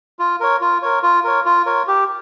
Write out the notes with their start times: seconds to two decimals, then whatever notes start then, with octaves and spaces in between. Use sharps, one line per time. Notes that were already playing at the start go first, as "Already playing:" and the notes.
0.19 F4
0.40 A#4 C#5
0.61 F4
0.82 A#4 C#5
1.03 F4
1.24 A#4 C#5
1.45 F4
1.66 A#4 C#5
1.87 G4